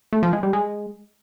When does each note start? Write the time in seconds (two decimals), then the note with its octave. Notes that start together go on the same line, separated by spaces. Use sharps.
0.13 A3
0.23 F3
0.33 G#3
0.43 G3
0.53 G#3